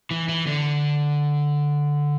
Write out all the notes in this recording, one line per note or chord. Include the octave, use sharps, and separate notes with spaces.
E3
E3
D3